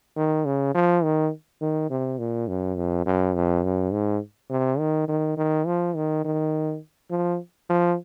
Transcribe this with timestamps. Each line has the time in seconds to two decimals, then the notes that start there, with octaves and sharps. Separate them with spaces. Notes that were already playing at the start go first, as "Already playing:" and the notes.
0.16 D#3
0.45 C#3
0.75 F3
1.04 D#3
1.61 D#3
1.90 C3
2.19 A#2
2.48 F#2
2.77 F2
3.06 F#2
3.34 F2
3.64 F#2
3.92 G#2
4.50 C3
4.79 D#3
5.08 D#3
5.37 D#3
5.66 F3
5.95 D#3
6.25 D#3
7.11 F3
7.70 F3